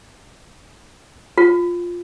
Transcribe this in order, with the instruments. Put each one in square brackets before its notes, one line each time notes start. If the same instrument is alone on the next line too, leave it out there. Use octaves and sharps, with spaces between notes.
[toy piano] F4